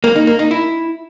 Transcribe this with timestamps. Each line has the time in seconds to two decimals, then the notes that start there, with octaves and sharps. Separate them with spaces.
0.04 A#3
0.16 D#4
0.27 A#3
0.39 D#4
0.51 E4